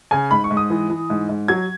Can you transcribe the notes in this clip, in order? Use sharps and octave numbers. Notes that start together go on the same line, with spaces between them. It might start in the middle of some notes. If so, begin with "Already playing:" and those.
C#3 G#5
G#2 B5
C#6
G#2
D#6
E3
E3
G#2
G#2
F#3 G#6